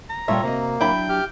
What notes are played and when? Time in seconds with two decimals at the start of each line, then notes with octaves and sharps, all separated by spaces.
0.10 A#5
0.28 A#2 G3 F4 A4 C#5 E5 G5
0.43 C3 A#3 F#4 D#5
0.81 F#3 D4 E4 G5 B5
1.09 G4 F6